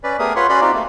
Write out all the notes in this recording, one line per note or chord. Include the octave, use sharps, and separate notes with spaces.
C#4 B4 D5
A3 B3 G4 G#4 A#4 D#6
F4 B4 C#5 F#5 C6
C#4 F#4 D5 B5 C6
C4 D#4 F4 G4
A3 A#3